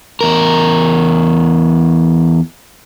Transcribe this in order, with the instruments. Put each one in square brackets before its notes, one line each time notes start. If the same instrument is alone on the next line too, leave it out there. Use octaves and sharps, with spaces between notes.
[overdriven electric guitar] E2 A#4